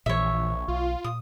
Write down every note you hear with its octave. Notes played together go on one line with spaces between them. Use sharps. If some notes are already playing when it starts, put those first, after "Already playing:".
A#1 A#2 E3 C#5 E5
B1 F4
A#2 D#6